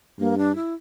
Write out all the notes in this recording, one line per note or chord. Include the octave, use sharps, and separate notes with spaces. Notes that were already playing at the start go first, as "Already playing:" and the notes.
G2 A#3
D4
E4